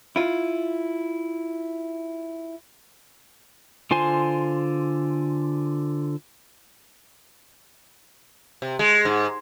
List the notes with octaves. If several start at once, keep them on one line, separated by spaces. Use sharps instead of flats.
E4 F4
D3 F4 C5 G#5 C6
C3
G#3
G#2